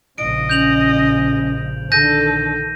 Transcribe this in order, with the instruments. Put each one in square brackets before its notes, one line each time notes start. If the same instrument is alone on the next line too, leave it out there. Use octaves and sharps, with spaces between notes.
[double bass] A#1 C#3 [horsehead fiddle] D#5 [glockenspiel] D7
[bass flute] C#4 [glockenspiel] G6 F7 F#7
[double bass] A#1 D#3 [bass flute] D3 [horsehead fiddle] A4 [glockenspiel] G6 A#6 D#7